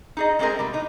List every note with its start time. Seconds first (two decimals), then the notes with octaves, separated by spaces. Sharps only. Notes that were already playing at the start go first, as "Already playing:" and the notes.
0.17 D#4 G#4 D#5
0.39 G#3 A3 C4 G#4 A#4
0.59 B2 G3
0.73 A2 D#4